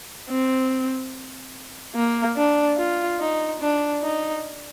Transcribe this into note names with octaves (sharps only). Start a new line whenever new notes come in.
C4
A#3
D4
F4
D#4
D4
D#4